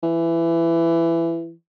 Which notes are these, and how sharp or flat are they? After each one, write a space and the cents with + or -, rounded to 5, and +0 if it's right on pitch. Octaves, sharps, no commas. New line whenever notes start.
E3 +20